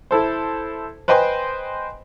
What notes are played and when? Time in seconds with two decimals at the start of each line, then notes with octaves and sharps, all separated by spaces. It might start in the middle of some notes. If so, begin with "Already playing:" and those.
0.11 E4 A4 C5
1.08 B4 C5 D#5 G5 G#5 C6